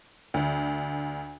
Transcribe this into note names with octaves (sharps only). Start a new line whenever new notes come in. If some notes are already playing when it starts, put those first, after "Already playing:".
D2